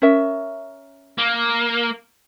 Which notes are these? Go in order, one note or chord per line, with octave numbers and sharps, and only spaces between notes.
C#4 A#4 E5
A#3